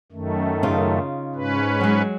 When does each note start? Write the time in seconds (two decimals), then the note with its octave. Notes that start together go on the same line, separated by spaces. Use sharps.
0.12 F#2 D#3 A3
0.63 C#3 D#4 F4
1.35 G#2 C#4 B4
1.81 F#3 G#3